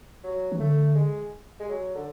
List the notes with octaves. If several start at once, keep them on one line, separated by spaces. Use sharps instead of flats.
F#3
E3
D3 A3
G#3
G#3
F#3
D3